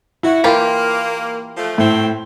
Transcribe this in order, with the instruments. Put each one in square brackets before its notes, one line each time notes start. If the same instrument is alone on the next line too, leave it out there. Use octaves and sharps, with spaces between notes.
[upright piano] E4 [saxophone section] F#4
[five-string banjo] E3 F4 G4 [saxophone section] A#3 [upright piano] A#4
[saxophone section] F3 A3
[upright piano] A2 [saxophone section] A3 C4